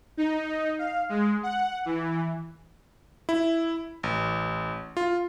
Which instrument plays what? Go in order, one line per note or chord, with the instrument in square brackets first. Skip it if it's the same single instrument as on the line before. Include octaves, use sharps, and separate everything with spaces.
[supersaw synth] D#4
F5
G#3
F#5
E3
[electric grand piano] E4
A1
F4